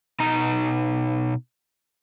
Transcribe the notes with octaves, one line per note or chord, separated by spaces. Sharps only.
B2 D#4 A#5